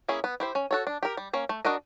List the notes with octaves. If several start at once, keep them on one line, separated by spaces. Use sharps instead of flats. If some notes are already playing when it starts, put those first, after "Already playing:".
A#3 C#4 E4 G#4
B3
E4 G4 C5
C#4
F#4 A4 C#5
D4
G4 A#4
G3
A#3 C#4
A3
D4 F#4 A#4 D#5